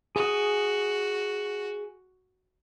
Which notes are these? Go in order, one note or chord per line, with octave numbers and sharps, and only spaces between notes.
F#4 G#4 D#6